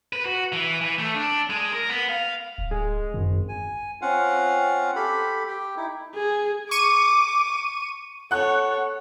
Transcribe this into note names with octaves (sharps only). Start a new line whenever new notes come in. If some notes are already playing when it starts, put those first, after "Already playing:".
B4
F#4
E3
E3
A3
D4
G#3
A#4
B3
F5
D1
G#3
G#1 F#2
G#5
C4 C#4 F4 F5 F#5
G4 A4 B5
G4 G5
D#4 E4
G#4
C#6 D6 D#7
A4 C#5 F#5 F#6